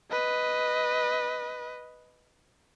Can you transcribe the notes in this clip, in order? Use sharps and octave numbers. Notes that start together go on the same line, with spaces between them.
B4 D#5